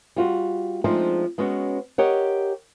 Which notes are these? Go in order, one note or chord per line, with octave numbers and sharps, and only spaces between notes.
G3 F4 F#4
F3 G#3 A3 C4 D4 D#4
G#3 B3 C#4 F#4
G4 A#4 C#5 D#5 F#5